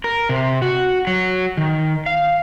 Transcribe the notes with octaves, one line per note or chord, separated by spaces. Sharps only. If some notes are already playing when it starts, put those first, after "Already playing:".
A#4
C3
F#4
F#3
D#3
F5